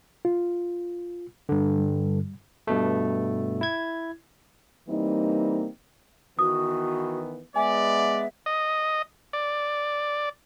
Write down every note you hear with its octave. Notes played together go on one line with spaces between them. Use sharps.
F4
G2 D3
G3
G2 B2 A3
E4 G#6
E3 G3 A#3 C4 D#4
D#3 E3 B3 F#4 D#6
G#3 B3 D5 E5 G#5
D#5
D5